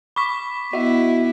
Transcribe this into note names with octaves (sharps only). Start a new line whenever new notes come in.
B5 C#6 D6 B6
B3 E4 F#4 D#5 E5